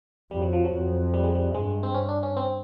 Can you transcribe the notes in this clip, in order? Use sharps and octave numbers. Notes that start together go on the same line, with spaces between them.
F2 G3
F#3
F3
F#3
F2
G3
G#3
G3
G2 G#3
C4
C#4
D4
C#4
C4